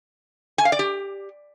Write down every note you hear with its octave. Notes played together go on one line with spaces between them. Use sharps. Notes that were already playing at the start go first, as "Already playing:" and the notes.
G#5
F5
D5
G4